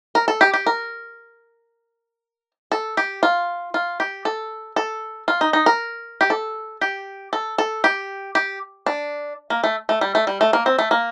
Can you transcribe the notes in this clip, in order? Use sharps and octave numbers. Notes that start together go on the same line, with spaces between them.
A#4
A4
G4
G4
A#4
A4
G4
F4
F4
G4
A4
A4
F4
D#4
D#4
A#4
G4
A4
G4
A4
A4
G4
G4
D4
A#3
A3
A3
G3
A3
G3
A3
A#3
C4
A3
A#3